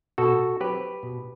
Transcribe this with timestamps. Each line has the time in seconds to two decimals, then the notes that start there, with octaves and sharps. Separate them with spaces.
0.18 B2 F#4 A4
0.60 F#3 C4 G4 B4
1.03 B2